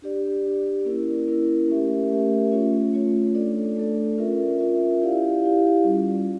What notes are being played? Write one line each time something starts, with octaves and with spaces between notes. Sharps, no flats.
D4 G4 D5
D4 G4 D5
A#3 C#4 E4 A#4
A#3 C#4 E4 A#4
A3 C#4 G4 A#4 E5
A3 C#4 G4 A#4 E5
A3 C#4 F4 C#5
A3 C#4 F4 C#5
A3 D4 A4 D5
A3 D4 A4 D5
C#4 F4 A#4 E5
C#4 F4 A#4 E5
E4 G4 D5 F5
E4 G4 D5 F5
G3 C#4 F4